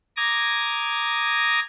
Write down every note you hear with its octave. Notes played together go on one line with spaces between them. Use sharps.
A#5 D6 D#6 G#6 A#6